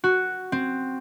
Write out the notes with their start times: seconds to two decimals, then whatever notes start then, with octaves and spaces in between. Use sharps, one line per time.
0.04 F#4
0.52 C4